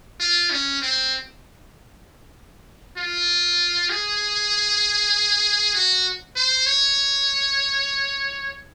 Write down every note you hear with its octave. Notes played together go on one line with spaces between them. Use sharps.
F4
C#4
C4
F4
G#4
F#4
C5
C#5